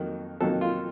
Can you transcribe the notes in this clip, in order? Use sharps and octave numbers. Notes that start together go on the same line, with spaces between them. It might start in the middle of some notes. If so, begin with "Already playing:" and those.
Already playing: F2 D#3 F#3 A#3
F2 D#3 F#3 A#3 A4
F4